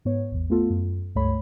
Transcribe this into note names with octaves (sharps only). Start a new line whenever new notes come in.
G#2 B3 C#5
A1 E2
A3 B3 F4 A4
F#2
C#2 G2 A3 C#5 B5